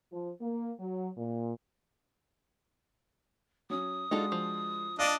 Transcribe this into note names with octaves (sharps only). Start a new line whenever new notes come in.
F3
A#3
F#3
A#2
F#3 C#4 D#6
G#3 D4 D#4 F4 F#4 A4
F3
D4 D5 D#5 F5 D6